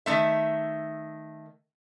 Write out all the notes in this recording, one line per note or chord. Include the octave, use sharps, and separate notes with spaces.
D#3 A3 E5